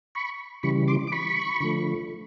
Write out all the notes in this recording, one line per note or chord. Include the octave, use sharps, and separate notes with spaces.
B5 C#6
C#3 E3 G3 B5 C#6
C6 D6
D6
B5 C#6
D3 F3 A3